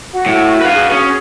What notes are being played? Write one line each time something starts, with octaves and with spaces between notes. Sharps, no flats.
F#4 F#5
A2
B4 F5
F#4 G#4 D#6
C#4